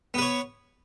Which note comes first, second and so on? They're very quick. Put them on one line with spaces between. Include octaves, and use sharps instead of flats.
B3 B4 C#5